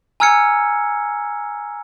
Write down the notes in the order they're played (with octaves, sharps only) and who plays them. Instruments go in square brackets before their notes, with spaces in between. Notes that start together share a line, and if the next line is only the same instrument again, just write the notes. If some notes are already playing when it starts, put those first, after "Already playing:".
[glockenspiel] G#5 A#5 E6 F6 G#6 C#7